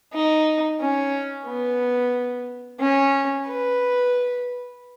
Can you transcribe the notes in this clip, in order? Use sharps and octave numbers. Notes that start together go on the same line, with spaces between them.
D#4
C#4
B3
C#4
B4